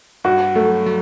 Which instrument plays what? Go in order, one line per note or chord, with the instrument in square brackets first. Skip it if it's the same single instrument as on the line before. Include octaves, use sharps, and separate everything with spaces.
[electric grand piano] G2 [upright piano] F#4
[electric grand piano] F#3 [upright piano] A3
[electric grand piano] F#3